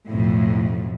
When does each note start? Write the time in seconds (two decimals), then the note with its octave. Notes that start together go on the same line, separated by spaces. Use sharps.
0.10 B1 F2 A2